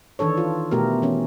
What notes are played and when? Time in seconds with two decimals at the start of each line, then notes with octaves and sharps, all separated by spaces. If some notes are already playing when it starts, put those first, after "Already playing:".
0.19 D#3 E3 D4 A4 C#5
0.38 F4
0.71 B2 A3 B3 G4 A#4
1.02 E3 C#4